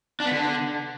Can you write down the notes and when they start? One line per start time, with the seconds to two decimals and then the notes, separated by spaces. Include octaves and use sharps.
0.20 D4
0.26 B3
0.32 D3